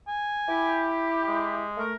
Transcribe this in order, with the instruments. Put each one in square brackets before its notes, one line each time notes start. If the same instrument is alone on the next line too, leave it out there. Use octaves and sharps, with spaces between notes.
[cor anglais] G#5
[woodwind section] E4 G4
[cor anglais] G#3
[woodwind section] A3 A#4